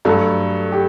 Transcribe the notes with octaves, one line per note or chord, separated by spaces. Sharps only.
G2 F#3 A3 F#4 A4
G4